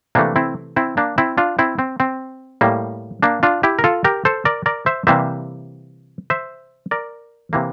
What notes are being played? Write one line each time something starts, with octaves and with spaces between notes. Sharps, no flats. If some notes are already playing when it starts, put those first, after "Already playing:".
C3 E3 A3 A#3 D4
C4 E4
C4 E4
A#3 D4
C4 E4
D4 F4
C4 E4
C4
C4
A2 G3 A#3
A#3 D4
D4 F4
E4 G4
A#4
F4 A4
G4 A#4
A4 C5
A#4 D5
A#4 D5
C5 E5
C3 E3 G3 A#3 C5 E5
C5 E5
A#4 D5
C3 E3 A#3